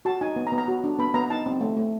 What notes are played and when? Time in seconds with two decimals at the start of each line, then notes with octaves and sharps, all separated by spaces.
0.05 F#4 A5
0.21 D#4 G#5
0.36 B3
0.47 A#5
0.52 B3
0.58 A#5
0.68 F#4
0.84 D4
0.99 B3 B5
1.14 B3 A#5
1.30 D#4 A5
1.46 C4
1.61 A3
1.77 A3